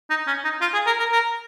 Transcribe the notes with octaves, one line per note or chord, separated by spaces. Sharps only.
D#4
C#4
D#4
F4
G#4
A#4
A#4
A#4